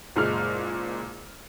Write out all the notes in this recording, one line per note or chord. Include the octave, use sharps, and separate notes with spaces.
F#1 A#2 G#3 F6